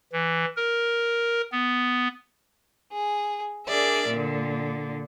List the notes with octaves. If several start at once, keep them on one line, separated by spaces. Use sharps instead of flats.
E3
A#4
B3
G#4
D4 G#4 A#4 D5 E5
A#2 D3